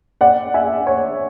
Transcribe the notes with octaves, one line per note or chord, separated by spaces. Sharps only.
D5 F#5
E5 G#5
C#5